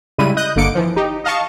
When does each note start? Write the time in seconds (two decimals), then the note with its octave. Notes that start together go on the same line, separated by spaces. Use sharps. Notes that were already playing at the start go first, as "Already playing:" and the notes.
0.18 C#3 G3 G#3 E4 D#7
0.37 D#5 D#6 F#6 G6
0.56 G1 D3 A#3 D6 C#7 D7
0.75 E3 F3
0.96 D#4 G4
1.24 D#5 F5 A5 C#6